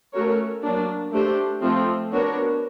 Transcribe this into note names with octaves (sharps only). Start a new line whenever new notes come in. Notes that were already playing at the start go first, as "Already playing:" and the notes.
A3 C#4 F#4 A#4 C#5
F#3 A#3 D4
A3 D4 G4 C5
F3 A3 C4
B3 D4 F#4 A#4 C#5